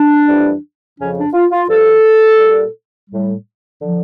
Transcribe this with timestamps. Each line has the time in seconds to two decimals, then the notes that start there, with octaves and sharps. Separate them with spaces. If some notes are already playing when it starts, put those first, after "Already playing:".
Already playing: D4
0.28 F2 E3 G3
0.98 F2 C#3 F3 C#4
1.16 D4
1.33 F4
1.51 F4
1.68 G2 F3 A4
2.39 A#2 G3
3.09 A2 G3
3.81 D3 F3